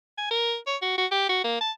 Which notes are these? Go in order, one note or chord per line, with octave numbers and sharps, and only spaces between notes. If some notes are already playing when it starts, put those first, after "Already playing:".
G#5
A#4
C#5
F#4
F#4
G4
F#4
A#3
A5